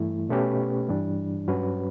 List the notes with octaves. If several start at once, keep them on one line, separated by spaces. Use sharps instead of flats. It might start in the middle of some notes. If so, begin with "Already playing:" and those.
Already playing: G2 E3 A3 E4
B2 A3 C#4 G4 B4
G2 E3 G3 D4
G2 F#3 C#4 F#4 B4